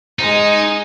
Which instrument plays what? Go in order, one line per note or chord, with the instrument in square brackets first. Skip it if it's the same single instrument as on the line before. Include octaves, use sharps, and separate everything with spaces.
[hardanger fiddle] G#3 [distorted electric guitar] D#4